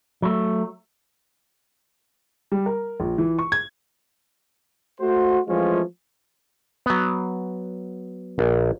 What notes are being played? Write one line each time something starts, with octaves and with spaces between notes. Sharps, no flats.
F#3 A3
G3
A#4
A#1
E3
C#6
G#6
A3 F#4 C5
E3 F3 G#3 A3 C#4 F4
F#3 B3
A#1